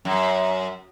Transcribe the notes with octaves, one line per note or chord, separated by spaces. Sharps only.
F#2